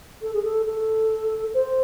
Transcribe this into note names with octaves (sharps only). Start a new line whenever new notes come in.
A4
G#4
A4
A4
C5